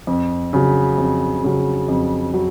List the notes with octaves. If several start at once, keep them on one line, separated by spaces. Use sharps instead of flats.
F2
C#3 F#3
F2
C#3 F#3
F2
F#3